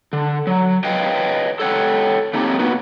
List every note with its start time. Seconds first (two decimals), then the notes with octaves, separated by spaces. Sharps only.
0.13 D3
0.47 F#3
0.84 B4 C#5 D#5 F5 G5
1.60 A4 C#5 F#5 G5
2.33 A3 A#3 C4 D#4 G4 C#5
2.59 A#3 B3 F#4 B4